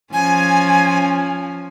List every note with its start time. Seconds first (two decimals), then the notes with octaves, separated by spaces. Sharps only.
0.13 F3 C#4 G#5